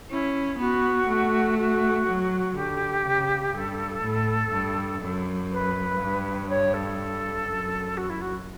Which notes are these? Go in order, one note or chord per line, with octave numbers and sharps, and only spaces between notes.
C#4 E4
B3 F#4
A3
F#4
F#3
D3 G4
C#3
G2 A4
A2
G2
F#2
B4
G2
C#5
A4
F#2
F#4
E4
F#4